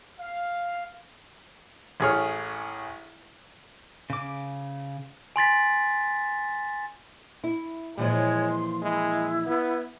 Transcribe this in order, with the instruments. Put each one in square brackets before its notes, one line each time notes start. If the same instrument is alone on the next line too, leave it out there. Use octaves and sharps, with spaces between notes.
[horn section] F5
[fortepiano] A1 A3 G#4 C#5 F6
[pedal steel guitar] C#3 D6
[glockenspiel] G#5 C6 A6 B6
[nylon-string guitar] E4
[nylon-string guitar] A#2 E3 F3 [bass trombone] G#3 [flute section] C#5
[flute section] C6
[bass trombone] G#3 [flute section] E4
[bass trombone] B3